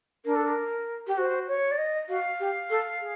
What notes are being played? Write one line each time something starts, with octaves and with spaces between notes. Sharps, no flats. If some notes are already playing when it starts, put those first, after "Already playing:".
D4 A#4
A4
A#4
G4
F#4 C5
C#5
D5
D#5
F#4 F5
G4
A4
G#4